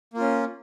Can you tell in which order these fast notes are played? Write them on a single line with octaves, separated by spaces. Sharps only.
A#3 F4 C#4